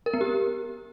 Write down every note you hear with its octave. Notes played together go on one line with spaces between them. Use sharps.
A#4
B3
G4